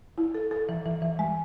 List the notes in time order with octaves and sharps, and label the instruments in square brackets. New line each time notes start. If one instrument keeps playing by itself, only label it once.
[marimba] E4
A4
A4
E3
E3
E3
G#3